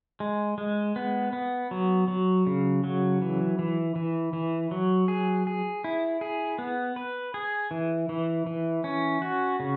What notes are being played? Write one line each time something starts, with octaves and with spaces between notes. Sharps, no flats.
G#3
G#3
B3
B3
F#3
F#3
C#3
F#3
E3
E3
E3
E3
F#3
G#4
G#4
E4
G#4
B3
B4
G#4
E3
E3
E3
C#4
F#4
C#3